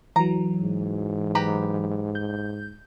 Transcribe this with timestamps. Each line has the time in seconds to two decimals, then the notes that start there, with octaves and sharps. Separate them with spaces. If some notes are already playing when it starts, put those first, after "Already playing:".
0.16 E3 F#3 A#5
0.60 G#2
1.35 G4 B4 A#5
2.15 G6